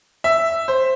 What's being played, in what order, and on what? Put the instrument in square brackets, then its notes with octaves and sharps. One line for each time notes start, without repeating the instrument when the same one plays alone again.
[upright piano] E5
C5